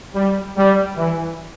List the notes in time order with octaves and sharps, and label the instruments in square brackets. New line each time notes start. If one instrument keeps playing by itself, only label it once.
[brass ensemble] G3
G3
E3